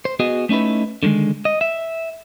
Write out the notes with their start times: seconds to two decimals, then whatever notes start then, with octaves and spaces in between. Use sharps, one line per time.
0.05 C5
0.20 B3 F#4 G#4 D#5
0.49 A3 C#4 D#4 E4 B4
1.03 D3 D#3 F3 G#3
1.45 D#5
1.61 E5